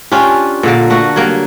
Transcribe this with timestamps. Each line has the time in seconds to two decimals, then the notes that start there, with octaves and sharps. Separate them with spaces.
0.12 C#4 D4 F4 G4
0.63 A#2 D3 A#3
0.90 A3 A#3 F#4
1.16 F#3 G3 A#3